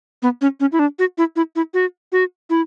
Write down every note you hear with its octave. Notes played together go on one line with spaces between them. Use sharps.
B3
C#4
C#4
E4
D4
F#4
E4
E4
E4
F#4
F#4
E4